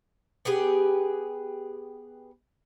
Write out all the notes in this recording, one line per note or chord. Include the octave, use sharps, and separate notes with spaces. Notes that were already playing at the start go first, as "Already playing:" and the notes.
B3 G4 G#4 B4